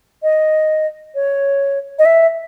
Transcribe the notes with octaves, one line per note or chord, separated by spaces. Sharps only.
D#5
C#5
D#5
E5